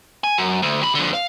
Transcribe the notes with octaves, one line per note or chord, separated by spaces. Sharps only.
G#5
F#2
D2
C3 B5
F2 D3
F5